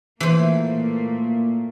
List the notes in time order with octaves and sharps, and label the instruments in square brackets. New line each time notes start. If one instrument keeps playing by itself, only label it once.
[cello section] A#2 A3 A#3 [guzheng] E3 C5